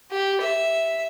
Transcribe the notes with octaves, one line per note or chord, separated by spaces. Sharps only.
G4
E5